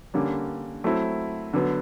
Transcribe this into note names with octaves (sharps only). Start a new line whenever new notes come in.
D3 G3 A#3 C#4
F#3 A3 C4 E4
D3 F#3 B3